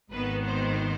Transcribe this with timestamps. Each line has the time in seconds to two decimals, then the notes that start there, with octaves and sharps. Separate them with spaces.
0.11 G#1 G#2 D#3 B3 B4
0.44 C5